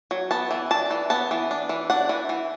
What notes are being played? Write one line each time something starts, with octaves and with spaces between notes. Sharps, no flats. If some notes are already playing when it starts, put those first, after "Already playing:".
F#3
B3 A5
E3
D4 A5
E3
B3 A5
E3
D4
E3
D4 F#5
E3
E3